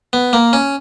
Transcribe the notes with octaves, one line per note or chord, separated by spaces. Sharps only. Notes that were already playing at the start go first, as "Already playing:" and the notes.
B3
A#3
C#4